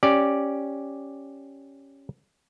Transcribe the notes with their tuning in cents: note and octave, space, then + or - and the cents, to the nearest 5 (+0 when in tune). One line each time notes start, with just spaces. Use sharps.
C#4 +0 G4 +0 D5 +0